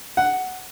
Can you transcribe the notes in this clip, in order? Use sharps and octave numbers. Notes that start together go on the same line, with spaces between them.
F#5